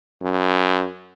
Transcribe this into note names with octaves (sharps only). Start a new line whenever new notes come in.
F#2